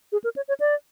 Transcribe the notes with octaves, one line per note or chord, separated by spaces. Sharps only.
G#4
A#4
C#5
C#5
D5